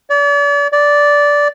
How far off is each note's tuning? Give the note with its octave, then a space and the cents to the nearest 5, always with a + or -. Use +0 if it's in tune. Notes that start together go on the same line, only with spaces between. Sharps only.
D5 -40
D5 -10